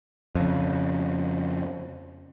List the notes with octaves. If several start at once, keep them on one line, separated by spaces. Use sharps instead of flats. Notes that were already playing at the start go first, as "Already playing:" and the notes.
F2 C#3